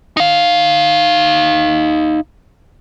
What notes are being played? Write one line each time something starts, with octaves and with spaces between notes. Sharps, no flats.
D#4 F5